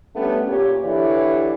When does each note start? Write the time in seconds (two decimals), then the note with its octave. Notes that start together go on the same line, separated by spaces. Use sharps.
0.15 G3 A3 B3 C#4 D4 G4
0.47 A#2 G4 C#5
0.85 D3 E3 E4 G4 C#5 D5